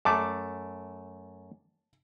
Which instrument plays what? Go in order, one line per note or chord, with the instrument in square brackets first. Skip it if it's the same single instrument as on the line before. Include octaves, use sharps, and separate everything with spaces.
[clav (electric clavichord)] F#2 A3 [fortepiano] A5 D6